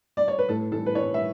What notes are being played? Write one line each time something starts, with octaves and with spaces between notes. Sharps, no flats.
D5
C#5
B4
A2 A4
E3 A4
B4
E3 C#5
E5